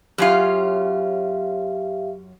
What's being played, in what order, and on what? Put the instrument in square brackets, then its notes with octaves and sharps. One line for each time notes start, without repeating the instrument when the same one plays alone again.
[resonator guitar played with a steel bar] F#2 C#4 F4 [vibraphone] G4 E5 F5